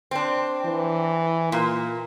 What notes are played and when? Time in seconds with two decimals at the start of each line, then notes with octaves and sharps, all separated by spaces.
0.11 C4 D4
0.65 E3
1.52 A#2 A#3